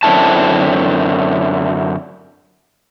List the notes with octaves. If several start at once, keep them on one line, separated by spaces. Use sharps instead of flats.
F#2 D3 C4 E4 A5